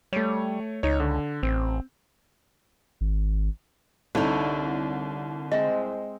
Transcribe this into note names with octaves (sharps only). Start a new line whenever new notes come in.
G3 A3 C#5
C#2 D#4 C#5
D3
A1 C4
G#1
C2 D3 D#4 E4 A4 C#5
G#3 C4 C5 D#5 E5